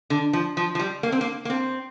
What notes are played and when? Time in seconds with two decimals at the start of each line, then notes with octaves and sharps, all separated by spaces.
0.10 D3
0.33 F3
0.57 F3
0.75 F3
0.79 G3
1.03 A#3
1.12 C4
1.21 A#3
1.45 A#3
1.50 C4